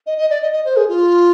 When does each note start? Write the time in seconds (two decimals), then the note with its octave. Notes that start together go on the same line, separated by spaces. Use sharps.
0.06 D#5
0.18 D#5
0.30 D5
0.42 D#5
0.52 D#5
0.65 C5
0.76 G#4
0.88 F4